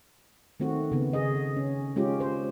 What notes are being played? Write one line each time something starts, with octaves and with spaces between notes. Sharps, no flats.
D#3 A3 C4 F#4
C#3 B3
G#4 D#5
C#4
G#3 C#4 F4 G4
C5